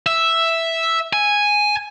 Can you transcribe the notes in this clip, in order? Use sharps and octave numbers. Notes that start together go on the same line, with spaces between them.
E5
G#5